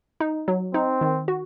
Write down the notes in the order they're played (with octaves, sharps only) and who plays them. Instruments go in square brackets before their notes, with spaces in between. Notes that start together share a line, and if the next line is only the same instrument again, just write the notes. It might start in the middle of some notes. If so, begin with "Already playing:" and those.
[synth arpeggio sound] D#4
F#3
[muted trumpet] C4 [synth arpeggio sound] D#4
[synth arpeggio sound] D#3
F#4